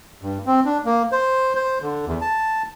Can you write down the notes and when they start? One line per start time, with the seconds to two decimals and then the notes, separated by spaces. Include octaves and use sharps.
0.22 G2
0.46 C4
0.65 D4
0.85 A#3
1.12 C5
1.55 C5
1.82 D3
2.07 E2
2.21 A5